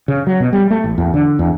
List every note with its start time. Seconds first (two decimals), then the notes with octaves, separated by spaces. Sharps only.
0.08 C#3
0.27 F#3
0.40 B2
0.53 G3
0.71 A3
0.84 A1
0.98 E2
1.14 D3
1.39 E2